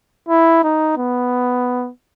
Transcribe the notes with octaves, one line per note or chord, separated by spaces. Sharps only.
E4
D#4
B3